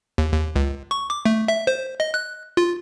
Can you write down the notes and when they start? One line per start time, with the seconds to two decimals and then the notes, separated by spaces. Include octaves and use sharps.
0.18 D#2
0.33 D#2
0.56 C#2
0.91 C#6
1.10 D6
1.26 A3
1.48 E5
1.67 C5
2.00 D#5
2.14 F#6
2.57 F4